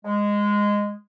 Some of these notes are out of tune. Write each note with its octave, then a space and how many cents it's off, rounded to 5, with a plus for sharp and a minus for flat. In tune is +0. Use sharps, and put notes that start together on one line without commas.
G#3 -10